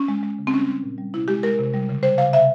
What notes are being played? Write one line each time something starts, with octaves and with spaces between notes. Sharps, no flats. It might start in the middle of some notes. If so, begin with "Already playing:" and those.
Already playing: C#4
G#3
G#3
C#3
C4
G3 C#4
G3
A#2
G3
C3 E4
G#3 G4
G#3 A#4
C3
G3
C#3
G3 C5
C#3 F5
C3 E5